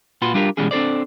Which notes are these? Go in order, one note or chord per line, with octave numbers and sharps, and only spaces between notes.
A#2 F4 F#4 B4 C6
G3 D4 F4 G4 A#4
B2 E3 G3 G#3 C#4 G#4
C4 D4 A4 C5 D5